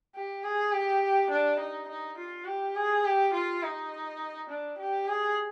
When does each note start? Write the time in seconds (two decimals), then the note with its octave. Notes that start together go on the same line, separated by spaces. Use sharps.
0.15 G4
0.44 G#4
0.73 G4
1.30 D4
1.59 D#4
1.88 D#4
2.18 F4
2.46 G4
2.75 G#4
3.05 G4
3.34 F4
3.63 D#4
4.50 D4
4.78 G4
5.07 G#4